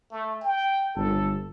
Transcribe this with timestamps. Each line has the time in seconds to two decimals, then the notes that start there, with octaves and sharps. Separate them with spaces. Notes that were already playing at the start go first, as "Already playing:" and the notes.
0.11 A3
0.42 G5
0.95 G1 A4